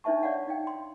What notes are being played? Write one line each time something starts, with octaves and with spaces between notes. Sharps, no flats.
D4 D#4 C5 E5 A5 C#6
C#5 D5 F5 F#5
D#4 F5 G5
C6